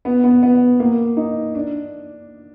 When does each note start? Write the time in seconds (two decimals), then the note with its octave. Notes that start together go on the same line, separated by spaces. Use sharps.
0.05 B3
0.24 B3
0.43 B3
0.80 A#3
1.17 D#4
1.55 D4